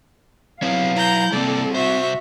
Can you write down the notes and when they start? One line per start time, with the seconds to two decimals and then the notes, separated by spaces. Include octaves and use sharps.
0.62 F#3 C4 E4 B4 C#5 F5
0.96 E4 A#5 G6
1.33 C3 G3 A#3 C4 A4 D5
1.75 C2 F#4 C5 E5